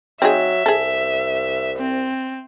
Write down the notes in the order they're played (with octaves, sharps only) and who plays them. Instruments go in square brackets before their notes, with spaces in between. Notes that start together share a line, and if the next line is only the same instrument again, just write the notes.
[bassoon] F#3 [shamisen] C4 D#4 G#4 [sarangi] E5
[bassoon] C2 [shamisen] G#4 A4
[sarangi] C4